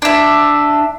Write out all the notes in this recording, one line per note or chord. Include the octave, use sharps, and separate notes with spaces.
D4 E5